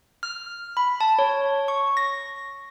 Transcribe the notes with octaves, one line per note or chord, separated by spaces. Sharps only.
F6
B5
A5
C#5
C#6
A#6